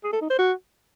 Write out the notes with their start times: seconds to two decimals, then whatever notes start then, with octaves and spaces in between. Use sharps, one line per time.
0.04 G#4
0.12 A4
0.21 D#4
0.30 C5
0.39 F#4